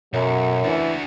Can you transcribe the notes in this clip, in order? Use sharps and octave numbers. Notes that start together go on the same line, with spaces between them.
B1 F#2 F#3
E3 D4 F#4